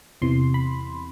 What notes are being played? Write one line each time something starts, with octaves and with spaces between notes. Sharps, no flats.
E2 C3 E3 C6
B5